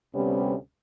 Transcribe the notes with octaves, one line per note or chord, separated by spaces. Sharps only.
D2 C3 G3 B3 C#4